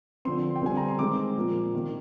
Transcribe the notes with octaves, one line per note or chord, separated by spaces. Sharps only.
D3 F3 C4 C6
G5
D3 G3 C4 G#5
A#5
C6
D#3 G#3 C4 D6
A#2 F3 A#3
C3 D#3 A#3